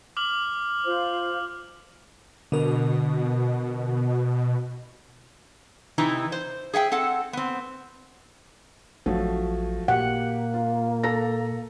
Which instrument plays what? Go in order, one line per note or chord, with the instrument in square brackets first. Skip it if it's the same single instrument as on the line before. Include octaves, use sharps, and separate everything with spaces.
[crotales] D6 F6 F#7
[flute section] F4 C5
[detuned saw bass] B2 [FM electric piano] D3 A#4
[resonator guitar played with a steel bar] C3 E3 D#4 E4 A#5
C5
G#4 E5 F#5 G5
C4 A4 F#5
B3 C4
[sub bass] A1 [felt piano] F3 F#3 A3
[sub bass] A#2 [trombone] A#3 [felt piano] G4 [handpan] F#5
[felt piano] F4
A4 A#5 A#6